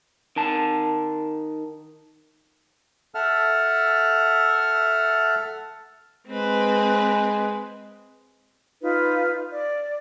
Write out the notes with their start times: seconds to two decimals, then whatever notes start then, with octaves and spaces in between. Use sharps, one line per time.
0.36 D#3 A5
3.15 A4 E5 F#5 A5 F6
6.27 G#3 C4 B4
8.81 D#4 F4 B4
9.53 D5